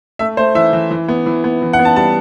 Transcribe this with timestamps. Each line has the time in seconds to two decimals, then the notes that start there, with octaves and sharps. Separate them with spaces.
0.19 A3 E5
0.37 A3 C5
0.55 E3 E5
0.73 E3
0.91 E3
1.09 B3
1.26 E3
1.44 B3
1.62 E3
1.73 F#5
1.79 B3
1.85 A5
1.96 G3 A5